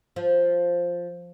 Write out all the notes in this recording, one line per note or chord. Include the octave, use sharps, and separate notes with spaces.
F3